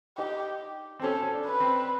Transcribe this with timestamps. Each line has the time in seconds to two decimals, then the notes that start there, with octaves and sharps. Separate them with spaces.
0.18 D#4 G4
0.99 C4
1.03 C#4 A4
1.23 C#4
1.32 D4
1.46 B4
1.60 C4